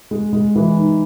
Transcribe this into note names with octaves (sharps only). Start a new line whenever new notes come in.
G#3
G#3
E3
D#4